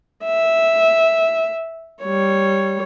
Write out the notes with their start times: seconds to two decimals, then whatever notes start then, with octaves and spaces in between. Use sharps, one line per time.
0.25 E5
2.04 G3 C#5